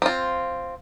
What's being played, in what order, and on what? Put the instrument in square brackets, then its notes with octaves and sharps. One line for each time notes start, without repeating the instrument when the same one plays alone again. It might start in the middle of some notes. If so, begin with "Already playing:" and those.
[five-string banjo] C4 F4